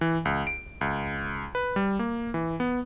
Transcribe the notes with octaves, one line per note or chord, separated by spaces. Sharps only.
E3
C#2
D7
C#2
B4
G3
A#3
E3
B3